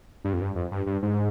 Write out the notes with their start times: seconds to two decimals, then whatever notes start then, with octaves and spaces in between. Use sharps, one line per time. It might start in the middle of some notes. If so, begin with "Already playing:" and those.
0.24 G2
0.34 F2
0.41 G2
0.55 F2
0.72 G2
0.86 G2
1.02 G#2